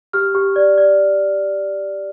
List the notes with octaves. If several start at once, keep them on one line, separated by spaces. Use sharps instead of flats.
G4 F6
G4
D5
D5